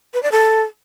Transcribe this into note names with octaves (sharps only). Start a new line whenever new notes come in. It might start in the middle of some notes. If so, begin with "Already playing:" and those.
B4
D5
A4